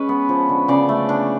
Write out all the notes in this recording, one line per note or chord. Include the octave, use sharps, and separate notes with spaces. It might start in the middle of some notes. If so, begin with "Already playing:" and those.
Already playing: G#3 C#4 B4
B3
F3
D3
C#3 D5
A3
D4